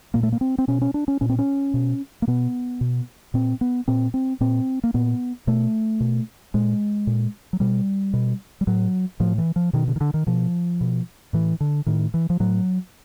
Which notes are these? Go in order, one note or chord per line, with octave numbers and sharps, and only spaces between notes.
A#2 A#3
A3
A#3
C4
C4
B2 C#4
C#4
D4
C#4
A#2 C#4
C4
C#4
B2
A#3
B2 B3
B2
A#2 C4
B3
A#2 C4
C4
A#2 C4
A#3
A#2 B3
B2 A3
B2
A#2 G#3
A#2
F#3
B2 G3
B2
G3
A2 F#3
A2 F3
E3
F3
B2 D#3
D3
D#3
D3
D#3
B2 F3
B2
A2 E3
D3
A2 D#3
E3
F3
A2 F#3